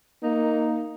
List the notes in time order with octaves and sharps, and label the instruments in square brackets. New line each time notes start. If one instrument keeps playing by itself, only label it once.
[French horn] A#3 [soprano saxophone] D#4